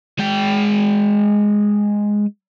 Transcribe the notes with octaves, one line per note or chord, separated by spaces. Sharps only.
G#3 G5